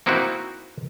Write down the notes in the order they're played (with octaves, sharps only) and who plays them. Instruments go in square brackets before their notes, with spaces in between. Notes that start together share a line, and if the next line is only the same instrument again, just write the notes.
[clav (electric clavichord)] A#3 C4 D#4 E4 F#4